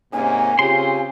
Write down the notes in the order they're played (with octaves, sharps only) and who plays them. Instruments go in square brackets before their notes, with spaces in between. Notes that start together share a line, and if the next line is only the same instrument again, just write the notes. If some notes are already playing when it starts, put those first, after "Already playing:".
[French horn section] G#2 A#3 C#4 [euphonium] C3 [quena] G#5
[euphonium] C#3 [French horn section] C4 F4 G4 [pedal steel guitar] C5 C6